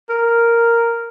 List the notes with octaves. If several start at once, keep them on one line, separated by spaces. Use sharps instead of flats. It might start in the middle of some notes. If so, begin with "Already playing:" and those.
A#4